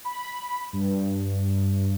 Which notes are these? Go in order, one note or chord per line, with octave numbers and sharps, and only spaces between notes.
B5
G2